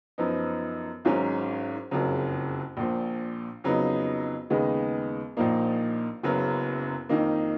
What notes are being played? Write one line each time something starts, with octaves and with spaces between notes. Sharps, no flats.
F#2 F3 B3 D#4
G#1 G#2 F#3 C#4
F#1 F2 C#3 F#3
A#1 A#2 F3
F2 C#3 F#3 B3 D#4
D#2 C#3 G#3 B3 D#4
A#1 A#2 F3 A#3 D#4
F#1 F#2 C#3 F#3 B3
F2 D#3 A#3 D#4